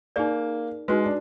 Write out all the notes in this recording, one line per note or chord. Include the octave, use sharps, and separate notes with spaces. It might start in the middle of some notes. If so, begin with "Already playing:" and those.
A#3 D#4 G#4 D5
G#3 D#4 F#4 B4
D4